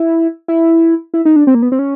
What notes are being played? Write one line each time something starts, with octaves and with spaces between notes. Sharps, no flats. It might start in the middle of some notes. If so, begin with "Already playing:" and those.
Already playing: E4
E4
E4
D#4
D4
C4
A#3
B3
C4
C#4